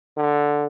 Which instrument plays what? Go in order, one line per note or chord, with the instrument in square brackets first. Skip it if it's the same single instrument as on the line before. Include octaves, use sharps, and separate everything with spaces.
[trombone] D3